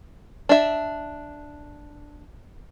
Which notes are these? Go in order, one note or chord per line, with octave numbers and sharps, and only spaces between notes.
D4 E5